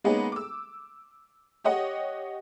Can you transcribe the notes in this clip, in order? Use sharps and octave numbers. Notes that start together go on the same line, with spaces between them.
G#3 A#3 B3 C#4 D#4 G#4
D6 E6
G4 C#5 D#5 F#5